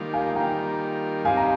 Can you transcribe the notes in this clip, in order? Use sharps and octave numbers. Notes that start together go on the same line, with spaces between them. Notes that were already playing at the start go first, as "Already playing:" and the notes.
Already playing: D#3 G3 A#3 F4
F5 G#5
D#3 G3 A#3 F4 G5 A#5
G2 G3 C4 D#4 F5 G#5
A#5